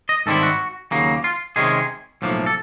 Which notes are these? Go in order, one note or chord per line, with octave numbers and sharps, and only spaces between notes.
D#5
G#2 D#3 G3 C4 E4 A4
F#4
D#2 C#3 F#3 A#3
F4
C3 D#3 G#3 C#4 G#4
B1 A2 F3 A#3
A4